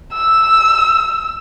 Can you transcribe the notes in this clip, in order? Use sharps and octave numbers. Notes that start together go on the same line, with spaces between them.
E6